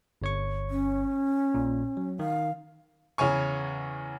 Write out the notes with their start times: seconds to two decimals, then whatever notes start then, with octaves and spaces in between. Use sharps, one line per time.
0.22 G1 C#5 C#6
0.70 C#4
1.54 A#1 A#2
1.97 F#3
2.19 D#3 F5
3.18 E2 C#3 C#5 G#5 C#6